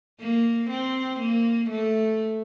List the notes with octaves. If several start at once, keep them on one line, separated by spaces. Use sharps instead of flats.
A#3
C4
A#3
A3